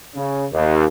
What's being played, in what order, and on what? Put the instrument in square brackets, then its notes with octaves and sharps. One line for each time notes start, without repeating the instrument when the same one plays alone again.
[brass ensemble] C#3
D#2